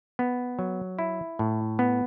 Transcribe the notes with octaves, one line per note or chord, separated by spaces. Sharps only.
B3
F#3
E4
A2
B3